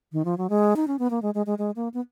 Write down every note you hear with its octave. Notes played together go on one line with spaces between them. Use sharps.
D#3
F3
F#3
G#3
D#4
C#4
B3
A#3
G#3
G#3
G#3
G#3
A#3
B3